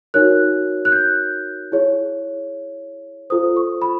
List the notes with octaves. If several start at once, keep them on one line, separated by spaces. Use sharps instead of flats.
D#4 F#4 A#4 C#5 F#6
F#6
G6
E4 G#4 C#5
F4 A4 C5 D#6
C#6
B5